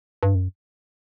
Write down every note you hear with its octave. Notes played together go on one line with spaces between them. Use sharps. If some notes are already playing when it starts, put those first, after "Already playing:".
G2
F#2